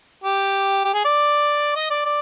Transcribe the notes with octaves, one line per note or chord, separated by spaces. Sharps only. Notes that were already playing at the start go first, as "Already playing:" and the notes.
G4
G4
G#4
D5
D#5
D5
D5